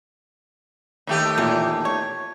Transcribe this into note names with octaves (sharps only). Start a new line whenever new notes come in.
D#2 A3 G4
E2 A#2
C#5